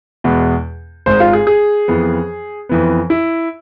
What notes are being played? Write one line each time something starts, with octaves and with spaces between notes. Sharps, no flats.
E2 B2 G#3 B3
G#1 G#2 G#3 C5
F4
G#4
G#4
F2 E3 B3
F2 E3 B3
E4